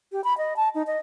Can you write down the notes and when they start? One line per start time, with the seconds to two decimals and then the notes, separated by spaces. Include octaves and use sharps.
0.12 G4
0.24 B5
0.38 D#5
0.56 A5
0.75 D#4
0.87 D#5